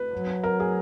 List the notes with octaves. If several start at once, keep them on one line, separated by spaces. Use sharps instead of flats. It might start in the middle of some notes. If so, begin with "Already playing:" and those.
Already playing: B4
F#3
A#4
G#4